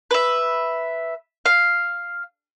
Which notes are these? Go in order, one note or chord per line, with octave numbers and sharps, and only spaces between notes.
B4 E5
F5